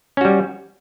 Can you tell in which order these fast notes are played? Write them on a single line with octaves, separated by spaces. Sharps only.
C#4 F#4 G3